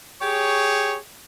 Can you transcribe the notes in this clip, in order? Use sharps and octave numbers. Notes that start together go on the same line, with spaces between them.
G4 G#4 C#5